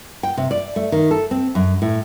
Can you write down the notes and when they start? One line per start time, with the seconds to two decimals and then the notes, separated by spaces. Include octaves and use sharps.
0.23 G5
0.37 C3
0.51 D5
0.76 A3
0.92 D#3
1.11 A4
1.31 C4
1.55 F#2
1.82 A2